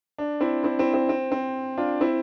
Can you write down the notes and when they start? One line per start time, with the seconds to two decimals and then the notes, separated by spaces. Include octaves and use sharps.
0.18 D4
0.40 C4 E4
0.63 C4 E4
0.79 C4 E4
0.94 C4
1.09 C4
1.32 C4
1.77 D4 F4
2.01 C4 E4